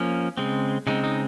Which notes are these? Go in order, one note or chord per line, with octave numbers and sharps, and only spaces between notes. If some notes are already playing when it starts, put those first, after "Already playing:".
Already playing: F3 A#3 C#4
C#3 G#3 C4
C#3 G#3 C4 D#4
D#4